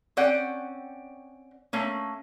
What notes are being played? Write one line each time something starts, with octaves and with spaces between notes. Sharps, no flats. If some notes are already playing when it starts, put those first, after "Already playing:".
C4 C#4 D5 F#5 G5
A3 A#3 C#4